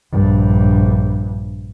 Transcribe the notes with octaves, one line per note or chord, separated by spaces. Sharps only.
A#1 G2